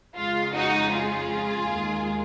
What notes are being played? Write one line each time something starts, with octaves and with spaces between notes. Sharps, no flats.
F2 C#3 G#3 F4
D#4 F#4
F4 G#4
D#2 D#3 G#3